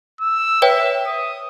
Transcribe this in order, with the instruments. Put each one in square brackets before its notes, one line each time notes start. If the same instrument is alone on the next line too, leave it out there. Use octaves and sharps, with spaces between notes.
[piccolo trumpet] E6
[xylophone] B4 C#5 G5 [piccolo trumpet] E5
[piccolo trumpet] D#6